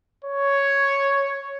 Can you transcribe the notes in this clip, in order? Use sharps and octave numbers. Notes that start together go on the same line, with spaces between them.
C#5